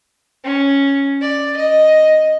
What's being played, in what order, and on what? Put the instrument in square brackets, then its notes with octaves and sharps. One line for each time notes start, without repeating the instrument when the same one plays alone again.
[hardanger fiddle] C#4
D5
D#5